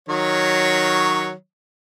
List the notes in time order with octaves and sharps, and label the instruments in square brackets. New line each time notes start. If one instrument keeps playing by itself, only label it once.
[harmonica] D#3 F#3 C#5